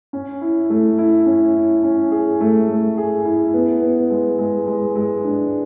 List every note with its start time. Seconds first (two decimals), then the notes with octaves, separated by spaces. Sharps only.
0.13 C#4
0.41 E4
0.70 A3
0.98 E4
1.26 C#4
1.55 E4
1.83 C#4
2.11 G#4
2.40 A3
2.68 A3
2.97 G#4
3.25 E4
3.54 B3
3.82 B3
4.10 G#3
4.39 G#3
4.67 G#3
4.96 G#3
5.24 D4